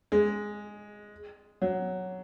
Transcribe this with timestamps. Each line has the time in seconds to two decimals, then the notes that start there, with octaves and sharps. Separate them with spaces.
0.12 G#3
1.62 F#3